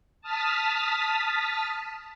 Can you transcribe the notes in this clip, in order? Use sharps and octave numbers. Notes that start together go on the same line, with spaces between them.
A5 D#6 F6 A6 B6